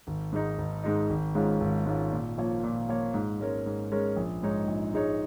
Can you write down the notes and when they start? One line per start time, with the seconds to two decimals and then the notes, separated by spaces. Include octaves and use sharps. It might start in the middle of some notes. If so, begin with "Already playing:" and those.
0.07 G#1
0.32 G#2 G#3 D#4
0.58 G#1
0.84 G#2 G#3 D#4
1.10 G#1
1.35 G#2 G#3 C#4 F4
1.60 G#1
1.86 G#2 G#3 C#4 F4
2.12 A#2
2.38 F3 A#3 F4 C#5
2.64 A#2
2.89 F3 A#3 F4 C#5
3.14 G#2
3.40 G#3 C#4 A#4 C#5
3.66 G#2
3.92 G#3 C#4 A#4 C#5
4.16 A#1
4.43 G#2 G#3 D#4 C#5
4.67 A#1
4.94 G#2 G#3 D#4 C#5